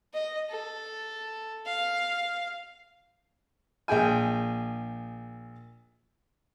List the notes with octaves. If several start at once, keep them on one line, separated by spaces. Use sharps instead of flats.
D#5
A4
F5
A#1 G#4 G5 G#5